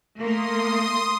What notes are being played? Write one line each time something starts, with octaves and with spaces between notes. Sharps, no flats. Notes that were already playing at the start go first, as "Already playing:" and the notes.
A3 A#3 C6 D#6